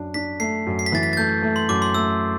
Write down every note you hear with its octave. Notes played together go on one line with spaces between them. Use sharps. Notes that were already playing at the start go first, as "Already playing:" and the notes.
Already playing: F#2 D4
D4 B6
A3 C7
F#2
C7
B6
E3 A6
B6
A6
A3 G6
A3
C6
F#2 D6
C6
A3 E6